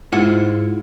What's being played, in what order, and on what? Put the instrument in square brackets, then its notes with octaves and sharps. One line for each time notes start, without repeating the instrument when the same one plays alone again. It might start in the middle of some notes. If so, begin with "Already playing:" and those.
[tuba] G#2 [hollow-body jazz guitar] E4 F4 F#5